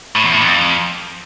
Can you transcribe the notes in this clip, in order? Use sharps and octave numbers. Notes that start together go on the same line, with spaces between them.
A2
E2
A2
F2